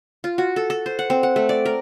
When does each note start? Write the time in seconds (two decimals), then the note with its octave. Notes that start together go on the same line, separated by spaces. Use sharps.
0.24 F4
0.38 F#4
0.56 A4
0.70 A4
0.86 C5
0.99 F#5
1.10 C4
1.23 F#5
1.36 A3
1.49 D5
1.66 A#4